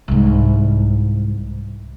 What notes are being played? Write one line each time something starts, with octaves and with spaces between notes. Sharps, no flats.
C2 G#2